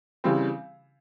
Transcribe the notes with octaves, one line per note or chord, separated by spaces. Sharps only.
C#3 E3 G3 C4